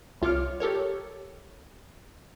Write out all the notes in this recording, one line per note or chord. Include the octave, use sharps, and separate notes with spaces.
C2 F4 C#5 D6 F6
G4 A4 A#4 C#5